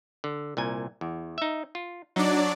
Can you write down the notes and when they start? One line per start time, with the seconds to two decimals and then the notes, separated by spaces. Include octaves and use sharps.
0.24 D3
0.57 C2 A#2 G#5
1.01 E2
1.38 D#4 E5
1.75 F4
2.16 F#3 D4 D#4 D5